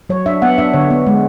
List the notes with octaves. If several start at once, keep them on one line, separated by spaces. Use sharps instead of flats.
F#3 C#5
D4 E5
B3 F#5
D4 E5
D3 C#5
B3
G#3